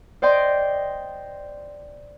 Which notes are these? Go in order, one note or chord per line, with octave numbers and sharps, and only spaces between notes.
C5 D5 D#5 G5 C6